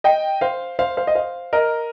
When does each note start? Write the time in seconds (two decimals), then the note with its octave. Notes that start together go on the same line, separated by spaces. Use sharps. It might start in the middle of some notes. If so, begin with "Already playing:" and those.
0.04 D#5 G5
0.41 C5 F5
0.79 C5 F5
0.97 C5 F5
1.07 D#5
1.15 C5 F5
1.53 A#4 D#5